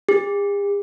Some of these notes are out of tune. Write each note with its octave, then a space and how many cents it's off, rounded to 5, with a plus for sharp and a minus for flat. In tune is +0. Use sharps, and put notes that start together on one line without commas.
G#4 -45